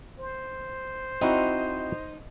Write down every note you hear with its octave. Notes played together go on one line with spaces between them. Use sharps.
C5
C4 D#4 E4 F#4